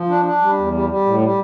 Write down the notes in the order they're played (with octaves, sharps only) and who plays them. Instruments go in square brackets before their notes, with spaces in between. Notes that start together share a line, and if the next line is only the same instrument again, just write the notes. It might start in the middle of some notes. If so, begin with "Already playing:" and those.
Already playing: [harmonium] F3
D4
D4
G3
E2
G3
G3
A2
G3